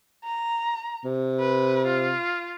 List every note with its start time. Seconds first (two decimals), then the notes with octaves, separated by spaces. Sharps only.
0.25 A#5
1.04 C3
1.40 B4
1.86 F4